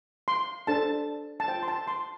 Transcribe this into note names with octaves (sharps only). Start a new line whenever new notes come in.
C6
D4 A4 C5 A5
A5
F4 C5 G5
C6
A5
C6